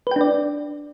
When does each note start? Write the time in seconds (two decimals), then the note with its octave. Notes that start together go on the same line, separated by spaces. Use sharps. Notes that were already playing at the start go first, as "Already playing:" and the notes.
0.07 B4
0.11 G5
0.16 D4
0.21 D5